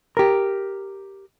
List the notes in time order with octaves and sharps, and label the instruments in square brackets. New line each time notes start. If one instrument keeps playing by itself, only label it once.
[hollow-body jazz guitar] G4 A#4